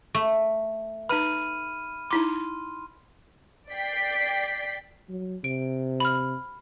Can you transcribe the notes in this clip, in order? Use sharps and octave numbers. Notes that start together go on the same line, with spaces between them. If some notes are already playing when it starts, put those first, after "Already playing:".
A3
D#4 B4 B5 F6 D#7
D#4 E4 C6 D6
D5 G5 B6 C7
F#3
C3 D7
B5 F6